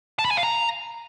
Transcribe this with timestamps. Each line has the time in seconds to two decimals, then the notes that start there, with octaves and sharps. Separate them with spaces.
0.19 A5
0.25 B5
0.31 G#5
0.37 F5
0.43 A#5